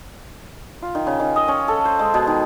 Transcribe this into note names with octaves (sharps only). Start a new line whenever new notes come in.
F4
D#3
C#3
D#3
D#5
C#4
A4
C5
G#3
B2
D#3